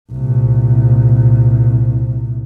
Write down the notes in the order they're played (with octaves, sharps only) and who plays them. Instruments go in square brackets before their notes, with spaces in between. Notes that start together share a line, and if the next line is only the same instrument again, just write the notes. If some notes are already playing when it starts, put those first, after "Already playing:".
[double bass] C2 A#2